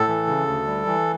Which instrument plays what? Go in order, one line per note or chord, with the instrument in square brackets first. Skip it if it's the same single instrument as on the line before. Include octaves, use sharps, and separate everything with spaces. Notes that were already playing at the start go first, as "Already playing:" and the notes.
Already playing: [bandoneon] A2 A4
E3
C#3
D2
G3
E3